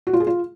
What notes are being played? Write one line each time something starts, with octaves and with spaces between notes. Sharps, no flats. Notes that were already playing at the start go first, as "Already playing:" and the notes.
F#4
F4
G#4
F4